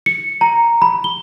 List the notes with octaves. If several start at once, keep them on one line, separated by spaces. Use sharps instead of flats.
C#7
A#5
B5
G7